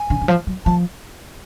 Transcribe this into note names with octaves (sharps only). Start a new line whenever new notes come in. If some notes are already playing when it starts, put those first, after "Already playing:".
Already playing: G#5
D3
D3
F3
F#3
F3 A5